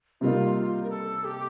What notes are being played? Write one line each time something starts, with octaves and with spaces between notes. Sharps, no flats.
C3 G3 A#3 D#4 F4
F4
A#4
A4
G4